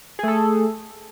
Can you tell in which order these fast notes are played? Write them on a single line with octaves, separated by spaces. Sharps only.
G#4 A3 A4